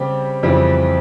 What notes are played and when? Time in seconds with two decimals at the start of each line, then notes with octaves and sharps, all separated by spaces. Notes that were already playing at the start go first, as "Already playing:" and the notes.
Already playing: C#3 G3 C4 G4
0.43 F2 C#3 E3 G3 C4